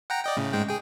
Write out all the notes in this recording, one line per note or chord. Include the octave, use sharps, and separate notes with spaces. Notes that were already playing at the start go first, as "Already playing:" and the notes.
F#5 G5 A#5
D5 D#5 G5
A2 C#3
G#2 G#3 G5
G#4 G5